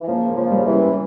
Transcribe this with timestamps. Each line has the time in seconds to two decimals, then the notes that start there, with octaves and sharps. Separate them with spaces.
0.01 E3
0.08 C#3 F3 A#3
0.30 A#3
0.36 C#3 F3
0.51 G3
0.57 C#3
0.66 C3 E3
0.73 C#4